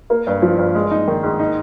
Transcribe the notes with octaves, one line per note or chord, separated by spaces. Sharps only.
A#3
G2
F3
G2
G#3
D#4
D#3
G#2
D#4